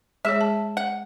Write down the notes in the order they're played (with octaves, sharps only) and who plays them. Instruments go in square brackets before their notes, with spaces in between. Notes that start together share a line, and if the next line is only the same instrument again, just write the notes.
[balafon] G#3 G#4 C#5 [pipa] E5
[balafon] A5
[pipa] F#5